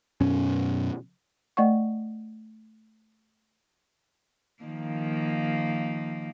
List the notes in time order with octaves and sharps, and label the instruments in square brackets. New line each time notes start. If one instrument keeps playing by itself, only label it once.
[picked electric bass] F#2 B2 C#4
[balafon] A3 D5 D#5 F#5 C#6
[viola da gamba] D#3 F3 A#3